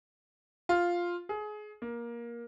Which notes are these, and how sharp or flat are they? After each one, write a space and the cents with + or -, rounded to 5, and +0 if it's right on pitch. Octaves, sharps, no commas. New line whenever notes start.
F4 +0
G#4 +25
A#3 +15